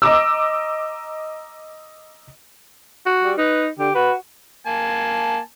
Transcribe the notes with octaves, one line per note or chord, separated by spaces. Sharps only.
D#5 A#5 D6 E6
F#4
G3
D#4 B4
D3 G4
F#4 B4
A#3 G#5 A5